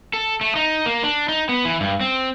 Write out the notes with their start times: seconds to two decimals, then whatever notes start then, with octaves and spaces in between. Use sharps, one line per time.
0.13 A4
0.41 A3
0.56 D#4
0.86 A#3
1.03 D4
1.29 D#4
1.49 B3
1.65 E3
1.80 G2
2.01 C4